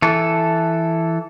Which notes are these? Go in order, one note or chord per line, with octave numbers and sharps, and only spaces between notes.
E3 A4